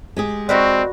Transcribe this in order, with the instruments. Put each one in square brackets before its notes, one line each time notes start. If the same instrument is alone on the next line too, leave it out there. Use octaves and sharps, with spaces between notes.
[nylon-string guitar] G#3 G4 G#4
[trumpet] C4 [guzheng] F#4 A#4 B4 [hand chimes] D5 D#5